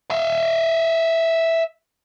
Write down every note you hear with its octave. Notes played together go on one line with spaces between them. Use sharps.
E5 F5